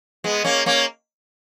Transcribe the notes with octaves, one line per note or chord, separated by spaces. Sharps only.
G#3 B3
A#3 C#4
A#3 C#4